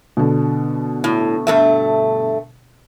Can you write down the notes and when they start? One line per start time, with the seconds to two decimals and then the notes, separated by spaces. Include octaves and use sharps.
0.17 B2 D3
1.04 A2
1.47 G2 A3 E5